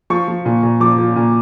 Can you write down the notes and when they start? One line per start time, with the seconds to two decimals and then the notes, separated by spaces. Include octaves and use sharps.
0.10 F3 C#6
0.28 F3
0.45 A#2
0.63 A#2
0.80 F3 D6
0.98 F3
1.16 A#2